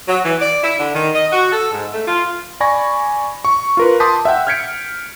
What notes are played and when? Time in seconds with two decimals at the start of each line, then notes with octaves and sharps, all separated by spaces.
0.08 F#3
0.24 E3
0.41 D5
0.63 E4
0.79 D3
0.95 D#3
1.14 D#5
1.32 F#4
1.52 A4
1.72 G#2
1.92 A3
2.07 F4
2.60 D5 G#5 B5 C#6 A#6
3.45 C#6
3.77 F4 A#4 B4
4.00 A5 C6 D6 D#6 G6 B6
4.25 E5 F#5 G5
4.47 F6 G6 G#6 B6 C#7 D7